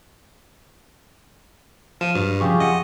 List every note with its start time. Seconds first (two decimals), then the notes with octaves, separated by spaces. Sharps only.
2.01 F3 F6 D#7 E7
2.15 G2 F#3
2.40 C#3 F3 F#3 F4 G4 G#4 C#6
2.60 F2 D#5 F#5